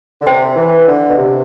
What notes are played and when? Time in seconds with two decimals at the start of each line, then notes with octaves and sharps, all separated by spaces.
0.20 D3
0.26 C3 C5 G5 C6
0.56 E3
0.87 D3
1.09 B2
1.17 C3